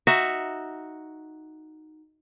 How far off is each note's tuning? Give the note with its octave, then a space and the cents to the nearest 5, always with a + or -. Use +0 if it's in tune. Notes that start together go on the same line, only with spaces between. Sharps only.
D#4 +0 F#4 +0 E5 +5